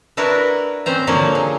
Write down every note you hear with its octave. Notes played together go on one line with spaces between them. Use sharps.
D4 E4 F#4 A#4 B4
C4 C#4 C5 A#5
D3 F3 F#3 A#3 C#5
G#4